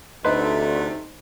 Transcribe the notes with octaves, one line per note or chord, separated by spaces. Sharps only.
D2 C3 A3 D#4 B4 C5